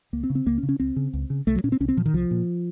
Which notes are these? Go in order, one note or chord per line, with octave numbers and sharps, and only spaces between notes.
C#2 A#3
C4
C#3
C4
C#2 A#3
C#4
C#3
C#4
C#2 C4
C#3
C#2
C#3
C2 A3
F#3
A#2 C#4
C4
C2 C#4
C4
A#2 F3
D#3
C2 F3
A#2